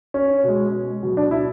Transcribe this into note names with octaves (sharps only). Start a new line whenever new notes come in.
C#4
B2 G#3
B2 F#3
D4
E4